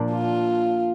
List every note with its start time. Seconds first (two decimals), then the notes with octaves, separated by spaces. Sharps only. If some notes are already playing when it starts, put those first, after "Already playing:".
Already playing: A#2 F3 A#3 D4
0.12 F4